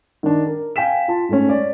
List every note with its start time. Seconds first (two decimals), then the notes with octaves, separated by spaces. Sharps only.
0.23 D#3 D4
0.46 A#4
0.76 F5 G5 G#5 B6 E7
1.08 F4 A5
1.29 G#2 A3 C#4
1.49 C#5 D5